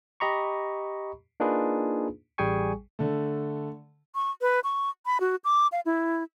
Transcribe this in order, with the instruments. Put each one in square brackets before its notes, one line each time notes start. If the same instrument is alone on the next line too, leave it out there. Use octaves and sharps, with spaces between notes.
[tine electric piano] G4 D#5 A#5 B5 C#6
A#3 D4 D#4 F4 G#4 B4
A1 G3 G#4 G5 G#5 C#6
[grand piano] D3 A3
[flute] C#6
B4
C#6
B5
F#4
D6
F5
E4